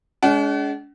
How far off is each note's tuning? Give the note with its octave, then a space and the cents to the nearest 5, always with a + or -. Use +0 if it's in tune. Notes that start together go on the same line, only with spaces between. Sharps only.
G#3 +20 D4 -45 F#5 +35